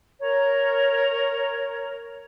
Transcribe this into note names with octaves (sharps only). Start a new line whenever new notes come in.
A#4 C#5 A#5